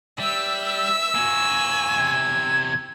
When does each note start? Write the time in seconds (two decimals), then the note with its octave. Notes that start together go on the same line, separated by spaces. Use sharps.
0.20 G3 E5 E6
1.15 A#3 F#4 G#5
1.97 E2 C3 G#6